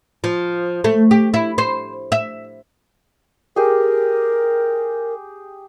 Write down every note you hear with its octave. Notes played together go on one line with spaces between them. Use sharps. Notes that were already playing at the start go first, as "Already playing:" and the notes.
F3
A3
G4
E4
C5
E5
G4 G#4 A#4